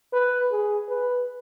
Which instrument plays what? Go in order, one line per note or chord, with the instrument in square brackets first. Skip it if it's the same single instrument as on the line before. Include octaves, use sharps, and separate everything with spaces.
[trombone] B4
G#4
B4